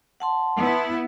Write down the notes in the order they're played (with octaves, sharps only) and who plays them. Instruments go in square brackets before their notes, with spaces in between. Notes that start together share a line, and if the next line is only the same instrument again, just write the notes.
[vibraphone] F#5 A5 C6
[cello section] B3 E4